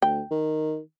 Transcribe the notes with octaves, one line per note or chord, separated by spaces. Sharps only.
D2 G5
D#3